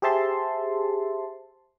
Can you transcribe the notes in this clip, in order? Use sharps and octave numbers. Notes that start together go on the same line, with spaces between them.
G4 G#4 C5 E5 A5 C6